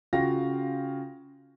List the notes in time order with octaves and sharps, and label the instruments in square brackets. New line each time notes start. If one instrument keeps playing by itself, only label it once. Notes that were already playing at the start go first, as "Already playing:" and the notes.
[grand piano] C#3 F4 F#4 F5 G5 A#6